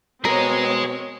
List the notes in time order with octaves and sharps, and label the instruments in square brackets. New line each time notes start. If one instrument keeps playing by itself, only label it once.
[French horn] B2 [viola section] C4 C#5 [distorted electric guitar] G#4 D#5 [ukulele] A#4